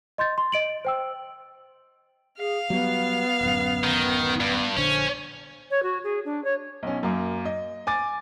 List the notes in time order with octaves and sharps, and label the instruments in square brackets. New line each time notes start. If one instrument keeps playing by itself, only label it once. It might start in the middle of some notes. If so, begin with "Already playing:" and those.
[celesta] D#5 C6 G6 A6
C6
D#5 D7 F#7
C5 G5 E6
[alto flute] G#4 [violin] F5
[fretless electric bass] F#3 G3 [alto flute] B3
[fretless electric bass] D1 F#2
[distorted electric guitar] D#3
G2
[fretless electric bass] A#1 D3 [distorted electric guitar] C#4 [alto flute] C5
[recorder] C#5
F#4
G#4
D4
C#5
[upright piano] B1 C#4
F#2 A#3
D#5
G#5 D6 A6